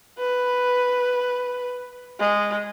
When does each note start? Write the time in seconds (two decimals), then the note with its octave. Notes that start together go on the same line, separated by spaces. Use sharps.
0.18 B4
2.20 G#3